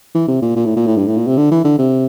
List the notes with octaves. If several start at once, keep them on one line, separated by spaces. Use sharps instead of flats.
E3
C3
A#2
A#2
A2
A#2
A2
G2
A2
A#2
C3
D3
E3
D3
C3